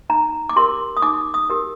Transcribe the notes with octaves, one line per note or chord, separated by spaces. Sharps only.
D#4 A#5
D6
G4 A#4 C6
D#6
D#4 D6
D#6
G4 A#4